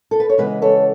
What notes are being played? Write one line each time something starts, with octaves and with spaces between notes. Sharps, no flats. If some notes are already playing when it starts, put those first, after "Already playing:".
A4
B4
C#5
C#3 E3 G#3 B3 B4 D#5
A4 C#5